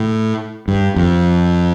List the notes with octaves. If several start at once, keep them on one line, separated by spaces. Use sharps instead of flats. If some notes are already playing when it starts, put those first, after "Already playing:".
Already playing: A2
G2
F2